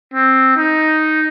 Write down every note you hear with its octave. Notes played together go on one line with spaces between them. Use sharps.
C4
D#4